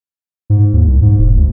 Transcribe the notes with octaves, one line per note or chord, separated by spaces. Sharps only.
G#2
D#2
C2
G#2
E1
D2